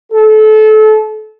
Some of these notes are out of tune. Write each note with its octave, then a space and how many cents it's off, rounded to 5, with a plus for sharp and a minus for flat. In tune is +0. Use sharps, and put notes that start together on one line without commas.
A4 -30